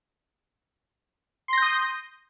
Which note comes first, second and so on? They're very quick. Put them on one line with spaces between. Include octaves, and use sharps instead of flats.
C6 A#6 G6 D#6